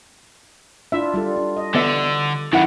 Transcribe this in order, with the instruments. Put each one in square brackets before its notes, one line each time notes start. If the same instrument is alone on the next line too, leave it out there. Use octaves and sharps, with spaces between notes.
[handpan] D4 E4 F4 [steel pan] E5
[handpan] G3 F4 A4
D4
D#5
[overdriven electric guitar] D3 [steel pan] B3 E5
[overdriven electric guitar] F#2 D#3 [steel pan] E4 F#5